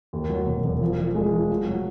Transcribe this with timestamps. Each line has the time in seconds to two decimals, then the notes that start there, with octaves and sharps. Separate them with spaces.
0.13 D#2
0.29 F#3
0.47 E1
0.64 E1
0.81 F3
0.99 F3
1.15 G#3
1.33 F3
1.49 F#3
1.66 F#3